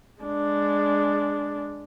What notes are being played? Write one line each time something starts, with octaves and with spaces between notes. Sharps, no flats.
G#3 D4